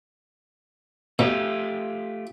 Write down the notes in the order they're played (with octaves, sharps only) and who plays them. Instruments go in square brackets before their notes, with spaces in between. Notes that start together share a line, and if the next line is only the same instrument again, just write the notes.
[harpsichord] B2 [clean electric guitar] A3 F4 G4